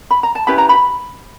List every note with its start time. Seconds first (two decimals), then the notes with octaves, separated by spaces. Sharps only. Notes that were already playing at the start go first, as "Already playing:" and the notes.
0.11 B5
0.23 A#5
0.35 A5
0.47 C#4 E4 G4 B4 B5
0.58 A#5
0.69 B5